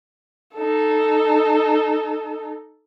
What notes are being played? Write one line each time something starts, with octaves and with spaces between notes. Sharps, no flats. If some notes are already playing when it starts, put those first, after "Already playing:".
D#4 A4